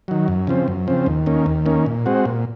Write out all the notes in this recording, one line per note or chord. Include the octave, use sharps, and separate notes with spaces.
D#3 F#3
F#2
C#3 F3 C4
F#2
C#3 F3 C4
D#2
D#3 A#3 C#4
D#2
D#3 A#3 C#4
A#2
G#3 C4 F#4
A#2